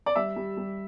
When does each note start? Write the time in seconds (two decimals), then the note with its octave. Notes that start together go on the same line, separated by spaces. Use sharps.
0.06 D5
0.16 G3 E5
0.36 G3
0.57 G3